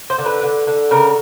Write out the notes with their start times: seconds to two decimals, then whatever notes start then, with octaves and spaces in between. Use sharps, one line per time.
0.10 C5
0.18 D3
0.26 B4
0.43 D3
0.67 D3
0.91 C#3 A#4